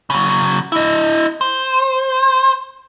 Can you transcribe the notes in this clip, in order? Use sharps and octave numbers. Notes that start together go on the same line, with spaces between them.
C#3 F#3
E4 D#5
C5